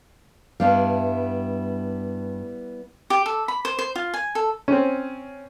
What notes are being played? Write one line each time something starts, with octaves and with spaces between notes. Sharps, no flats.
G2 G3 B3 E4 F5
G4
A4
B5
C5
C5
F4
G#5
A4
C4 C#4